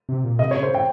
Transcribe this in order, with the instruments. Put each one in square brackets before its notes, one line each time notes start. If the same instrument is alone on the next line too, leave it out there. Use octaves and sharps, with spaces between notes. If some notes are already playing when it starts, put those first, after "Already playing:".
[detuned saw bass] C3
A#2
[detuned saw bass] C3 [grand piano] D#5
[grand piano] C#5
[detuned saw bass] C#3
[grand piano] C5
G5